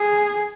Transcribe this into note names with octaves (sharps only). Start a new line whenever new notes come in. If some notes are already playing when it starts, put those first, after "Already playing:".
Already playing: G#4